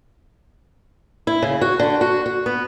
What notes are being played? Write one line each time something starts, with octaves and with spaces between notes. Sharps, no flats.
E4
C#3
F#4
D3
F#4
F#4
B3